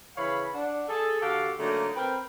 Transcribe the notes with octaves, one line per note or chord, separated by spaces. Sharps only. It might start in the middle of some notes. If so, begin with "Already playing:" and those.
C#3 E3 C#5 F5 B5
D4 F#5
G#4 A4
D3 F#4 G4 A4 F5
D3 F#3 A3 A#3 D#4
C4 A#4 B4 G5